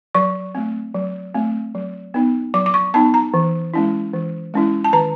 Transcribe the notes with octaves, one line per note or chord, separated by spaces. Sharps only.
F#3 C#6
A3 C4
F#3
A3 C4
F#3
B3 D#4
F#3 D6
D6
C#6
B3 D#4 A5
A#5
E3
G#3 C#4 E4
E3
G#3 C#4 E4
A5
D#3 A#5